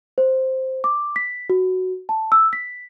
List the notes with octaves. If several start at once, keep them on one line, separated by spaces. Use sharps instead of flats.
C5
D6
B6
F#4
A5
E6
B6